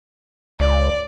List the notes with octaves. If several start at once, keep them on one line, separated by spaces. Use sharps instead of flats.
C#2 D5